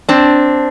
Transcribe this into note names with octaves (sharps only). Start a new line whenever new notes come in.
C4 D4